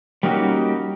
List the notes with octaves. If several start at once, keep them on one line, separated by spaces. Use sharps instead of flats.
G3 A#3 C#4 D#4 F#4 G4